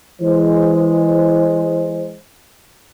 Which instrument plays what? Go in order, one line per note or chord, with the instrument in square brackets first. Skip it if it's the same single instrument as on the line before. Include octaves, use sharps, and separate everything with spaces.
[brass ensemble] E3 G#3 C5